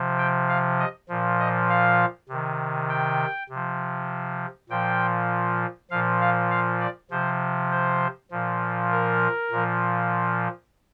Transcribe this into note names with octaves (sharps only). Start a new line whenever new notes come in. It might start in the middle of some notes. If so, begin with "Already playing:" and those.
Already playing: C3 F3
G5
F5
D#5
A#2 F3
D#5
F5
C3 D#3
G5
C3 F3
A#2 F3 G5
A#2 F3 F5
F5
F5
D5
C3 F3 C5
C5
A#2 F3
A#4
A#2 F3